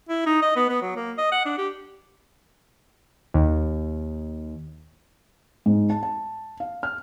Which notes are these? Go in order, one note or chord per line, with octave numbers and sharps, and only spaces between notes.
E4
D#4
D#5
B3
B3
F#3
A#3
D#5
F#5
D4
G4
D#2
G#2
A5
A5
F5
F6